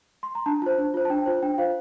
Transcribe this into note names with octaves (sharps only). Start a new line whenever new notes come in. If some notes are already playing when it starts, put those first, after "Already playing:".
C6
A#5
D4 A5
F4 C5 A5
D4
F4 C5
A5
D4 G5
F4 C5
D4 G5
F4 C5 F5